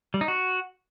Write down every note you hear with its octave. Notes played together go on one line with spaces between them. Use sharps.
G3
D#4
F#4